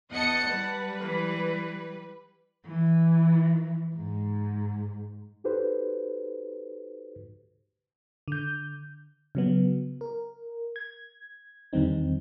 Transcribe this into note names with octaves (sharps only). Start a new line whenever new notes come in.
E2 D#5 F#5 A5 C#7
G3 B4
E3
E3
G#2
D#4 F#4 G4 A4 B4 C5
D3 G6
C#3 F#3 B3
A#4
G#6
E2 D3 D#3 G3 C4 D#4